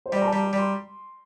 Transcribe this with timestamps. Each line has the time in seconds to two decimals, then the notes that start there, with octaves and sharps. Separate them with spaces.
0.06 C5
0.12 G3 D5
0.22 A#5
0.27 A5
0.33 G3
0.43 A#5
0.53 G3
0.58 C6